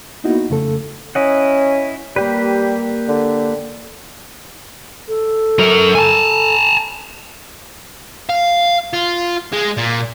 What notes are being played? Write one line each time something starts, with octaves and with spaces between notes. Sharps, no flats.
A#3 B3 D#4 E4 F#4
F2 C#3 A3 A4
C#4 E4 D#5 F#5
G3 A#3 G4 B4
D3
A4
F#3 A#4
G#5 A5
F5
F4
G#3
A#2